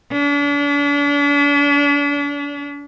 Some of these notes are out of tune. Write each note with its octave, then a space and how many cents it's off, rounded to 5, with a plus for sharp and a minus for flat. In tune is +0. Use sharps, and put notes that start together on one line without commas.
D4 -40